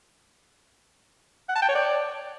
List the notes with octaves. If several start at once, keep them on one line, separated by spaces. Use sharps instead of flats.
F#5
A5
G5
C#5
D5